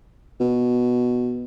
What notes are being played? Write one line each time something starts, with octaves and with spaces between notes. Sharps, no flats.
B2